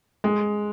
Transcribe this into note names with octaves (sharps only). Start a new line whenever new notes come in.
G#3